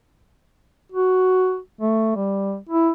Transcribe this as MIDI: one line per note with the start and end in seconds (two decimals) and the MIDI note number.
0.92 1.58 66
1.81 2.12 57
2.16 2.56 55
2.69 2.91 64